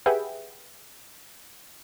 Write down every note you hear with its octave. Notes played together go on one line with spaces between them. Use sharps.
G4 G#4 B4 E5 F#5 G5